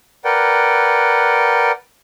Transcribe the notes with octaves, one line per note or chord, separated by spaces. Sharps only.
A#4 B4 D5 F#5 G5